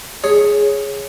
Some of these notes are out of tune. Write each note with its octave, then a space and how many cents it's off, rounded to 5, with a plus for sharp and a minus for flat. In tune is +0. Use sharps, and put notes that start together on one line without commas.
G#4 +0 C#5 +0